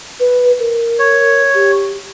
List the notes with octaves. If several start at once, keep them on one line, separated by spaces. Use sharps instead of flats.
B4
A#4
C#5
G4